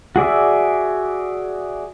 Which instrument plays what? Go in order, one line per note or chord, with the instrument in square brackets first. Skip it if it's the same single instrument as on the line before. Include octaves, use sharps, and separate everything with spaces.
[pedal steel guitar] F#4 G#4 D5 E5